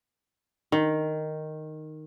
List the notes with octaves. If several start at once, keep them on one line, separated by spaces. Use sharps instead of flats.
D#3